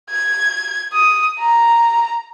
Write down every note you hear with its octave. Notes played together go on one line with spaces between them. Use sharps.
G#6
D#6
A#5